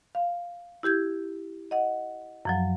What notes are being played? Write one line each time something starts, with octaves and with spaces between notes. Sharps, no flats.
F5
E4 G4 G6 G#6
D#5 F#5
F#2 F3 F#3